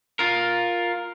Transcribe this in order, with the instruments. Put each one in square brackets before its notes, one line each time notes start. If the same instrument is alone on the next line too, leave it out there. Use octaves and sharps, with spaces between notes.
[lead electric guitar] F4 A#4